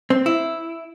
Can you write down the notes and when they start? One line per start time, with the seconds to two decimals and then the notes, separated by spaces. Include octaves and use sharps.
0.10 C4
0.26 E4